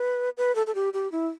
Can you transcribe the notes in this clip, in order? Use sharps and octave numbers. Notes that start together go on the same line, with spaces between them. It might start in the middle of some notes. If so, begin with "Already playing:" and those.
Already playing: B4
B4
A4
A4
G4
G4
E4